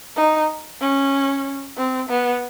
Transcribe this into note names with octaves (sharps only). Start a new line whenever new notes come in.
D#4
C#4
C4
B3